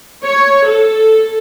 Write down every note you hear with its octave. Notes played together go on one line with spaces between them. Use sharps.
C#5
A4